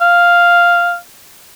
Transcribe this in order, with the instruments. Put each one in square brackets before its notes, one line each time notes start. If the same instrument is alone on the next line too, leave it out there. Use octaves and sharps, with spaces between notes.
[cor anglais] F5